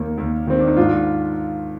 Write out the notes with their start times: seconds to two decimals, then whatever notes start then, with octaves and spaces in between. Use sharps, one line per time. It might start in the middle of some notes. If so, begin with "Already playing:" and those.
Already playing: D#2 D#3 A#3
0.18 D#2
0.47 D#3 C4
0.59 D4
0.67 D#4
0.77 G#2 D4 F4